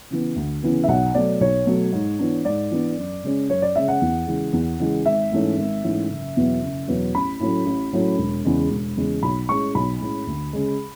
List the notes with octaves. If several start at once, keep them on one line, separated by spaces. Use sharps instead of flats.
C#3 E3 B3
D2
C#3 E3 B3
E5
B1 F#5
B2 F#3 A3 D5
B1 C#5
B2 F#3 A3
G#2
E3 B3 D4
G#2 D5
E3 B3 D4
F#2
C#3 G#3 C#4
F#2 C#5
D5
C#3 G#3 C#4 E5
F#5
E2
C#3 E3 G#3
E2
C#3 E3 G#3
G#1 E5
G#2 E3 A3 C#4
G#1
G#2 E3 A3 C#4
F#1
E2 B2 F#3 B3
F#1
E2 B2 F#3 B3
A1 B5
A2 F#3 A3 C#4
A1
A2 F#3 A3 C#4
E1
E2 C#3 G#3
E1
E2 C#3 G#3
B1 B5
A2 G#3 C#4 C#6
B1 B5
A2 G#3 C#4
D2
C#3 G#3